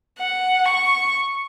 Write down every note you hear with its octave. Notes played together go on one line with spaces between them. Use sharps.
F#5
C#6